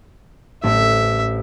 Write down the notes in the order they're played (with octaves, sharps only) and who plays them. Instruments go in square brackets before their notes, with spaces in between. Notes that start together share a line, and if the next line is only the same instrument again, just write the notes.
[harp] A1 C4 [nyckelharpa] E5